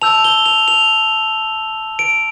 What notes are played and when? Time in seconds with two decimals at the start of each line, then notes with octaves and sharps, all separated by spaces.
0.02 A5 E6 G6 F7
0.24 G7
0.46 F7
0.68 F7
1.99 D7